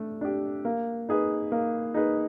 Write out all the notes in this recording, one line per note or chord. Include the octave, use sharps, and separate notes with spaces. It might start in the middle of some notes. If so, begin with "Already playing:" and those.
Already playing: A3 D4
D4 G4
A#3
D#4 G#4 B4
A#3
D#4 G#4 B4